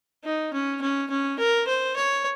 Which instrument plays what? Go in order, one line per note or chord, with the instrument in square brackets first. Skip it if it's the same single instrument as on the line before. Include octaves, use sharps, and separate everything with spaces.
[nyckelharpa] D#4
C#4
C#4
C#4
A#4
C5
C#5